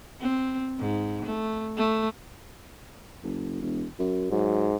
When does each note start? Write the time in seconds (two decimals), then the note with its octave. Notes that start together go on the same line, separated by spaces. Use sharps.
0.21 C4
0.80 G#2
1.25 A3
1.77 A3
3.24 F#1
3.62 E1
3.99 F#2
4.31 G#2 F#3